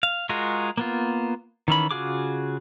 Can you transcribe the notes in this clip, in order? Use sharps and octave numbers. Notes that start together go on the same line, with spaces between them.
F5
G#3 F4 F#4 G#4 A#4
A#3 B3 F4
D#3 E3 C#4 B5
C#3 F4 F#4 G#4 D6